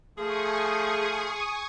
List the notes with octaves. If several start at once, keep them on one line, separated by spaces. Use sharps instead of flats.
F3 A3 G#4 G#5 C#6 D#6